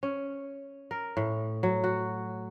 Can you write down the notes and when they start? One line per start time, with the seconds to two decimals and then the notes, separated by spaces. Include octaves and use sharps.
0.03 C#4
0.91 A#4
1.17 A2
1.63 F#3
1.84 F#4